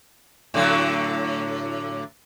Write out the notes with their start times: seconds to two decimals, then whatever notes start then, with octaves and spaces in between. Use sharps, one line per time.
0.54 A2 D3 F#3